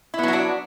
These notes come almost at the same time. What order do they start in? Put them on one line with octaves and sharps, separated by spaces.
E4 B3 F#3 F#4 D4